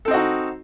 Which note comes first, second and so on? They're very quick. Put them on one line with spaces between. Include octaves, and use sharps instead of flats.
A4 C4 D#5 F#4 D#4